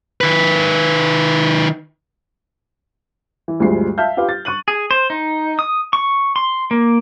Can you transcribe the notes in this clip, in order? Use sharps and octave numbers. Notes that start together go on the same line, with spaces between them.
D#3 B4
E3
D2 G2 F3 G#3 C7
E5 F5 A5 F6 G6
F4 G4 B4 F5
A6
C#6 F#6 D#7 F#7
G#4
C5
D#4
D#6
C#6
C6
A#3